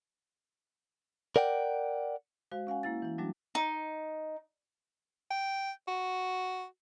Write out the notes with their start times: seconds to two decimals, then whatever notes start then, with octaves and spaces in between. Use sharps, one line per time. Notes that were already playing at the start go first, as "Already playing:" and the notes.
1.36 A#4 D5 F#5 G5
2.51 G#3 F#4 C5 F5
2.67 C#4 F5 F#5 G#5
2.83 A#3 E4 A6
3.02 E3 E4
3.18 F#3 G3 A3 D4 F#4
3.55 D#4
5.31 G5
5.88 F#4